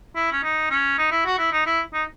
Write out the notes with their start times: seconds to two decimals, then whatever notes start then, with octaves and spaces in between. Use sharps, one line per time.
0.16 E4
0.32 C#4
0.43 D#4
0.70 C#4
0.98 D#4
1.11 E4
1.26 F#4
1.38 E4
1.52 D#4
1.66 E4
1.93 D#4